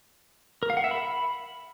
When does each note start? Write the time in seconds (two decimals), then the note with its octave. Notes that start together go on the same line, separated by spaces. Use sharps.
0.63 A#4
0.70 F5
0.77 F#5
0.84 E5
0.91 B5